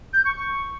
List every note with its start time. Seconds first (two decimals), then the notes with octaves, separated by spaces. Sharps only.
0.13 G6
0.25 C#6
0.36 C#6